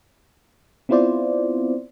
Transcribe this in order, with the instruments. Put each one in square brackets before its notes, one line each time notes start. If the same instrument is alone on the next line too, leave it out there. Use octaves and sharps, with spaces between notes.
[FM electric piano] B3 C4 E4 F4 C5 D5